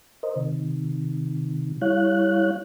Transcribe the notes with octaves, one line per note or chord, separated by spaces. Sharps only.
A#4 C5 D#5
C3 D#3
G3 E4 C#5 F5 F#6